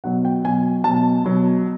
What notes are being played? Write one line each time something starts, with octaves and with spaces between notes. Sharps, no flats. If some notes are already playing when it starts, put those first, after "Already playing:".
B2 F#3 F#5
G5
B2 F#3 G#5
B2 F#3 A5
B2 F#3